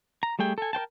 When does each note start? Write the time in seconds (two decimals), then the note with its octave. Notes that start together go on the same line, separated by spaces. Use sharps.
0.23 A#5
0.39 G3 A3 G#4 G5
0.58 A4 G#5
0.73 A#4 C5 G5 A5